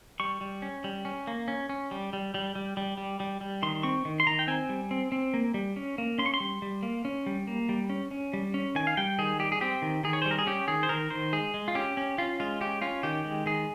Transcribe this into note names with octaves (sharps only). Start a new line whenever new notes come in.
G3 C#6
G3
C#4
G3
C#4
A#3
C#4
C#4
G3
G3
G3
G3
G3
G3
G3
G3
D#3 C6
C4 C#6
D#3
C6
D#3 A#5
G5
C4 G#5
G3
C4
C4
A#3
G3
C#4
A#3
C#4 C6
C#6
C6
G3
G3
A#3
C#4
G3
A#3
G3
C#4
C#4
G3
C#4
D#3 G#5
F5
G3 G5
D#3 G#4
G3 G4
G#4
C4 G4
D#3
D#3 G#4
C#5
C5
G3
A#4
G#4
C#4 G4
D#3 G#4
C5
D#3 A#4
D#3 C5
G#3 G#4
G#3
F4
C#4 G4
C#4
C#4 F4
G#3 F4
C#4 G4
C#4 F4
D#3 G4
G#3
D#3 G#4